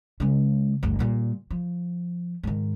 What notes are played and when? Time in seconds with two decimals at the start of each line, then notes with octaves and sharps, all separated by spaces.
0.20 C#3 G#3
0.83 G1 D2
0.99 A#2 G3
1.51 F3
2.43 G#2 D#3